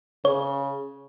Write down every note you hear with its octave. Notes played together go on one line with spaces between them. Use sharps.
C#3 C#5